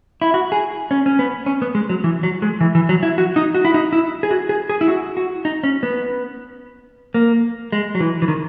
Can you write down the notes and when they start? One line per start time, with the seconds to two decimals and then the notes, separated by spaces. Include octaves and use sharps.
0.22 E4
0.34 F#4
0.52 G#4
0.91 C#4
1.06 C#4
1.19 B3
1.46 C#4
1.62 B3
1.75 G#3
1.90 F#3
2.04 E3
2.23 F#3
2.42 G#3
2.61 E3
2.75 E3
2.89 F#3
3.03 E4
3.18 F#4
3.36 D#4
3.55 F#4
3.65 E4
3.74 D#4
3.93 E4
4.23 G#4
4.31 F#4
4.49 G#4
4.69 G#4
4.81 E4
4.88 F#4
5.17 F#4
5.45 D#4
5.63 C#4
5.83 B3
7.14 A#3
7.72 G#3
7.95 F#3
8.00 E3
8.22 E3
8.28 D#3